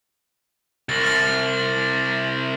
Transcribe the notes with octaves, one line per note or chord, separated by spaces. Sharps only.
C2 A6 A#6 F#7
F6 A6 F#7